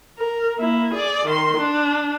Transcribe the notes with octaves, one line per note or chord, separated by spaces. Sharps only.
A#4
A#3 E4
G#4 D5
D#3 C6
D4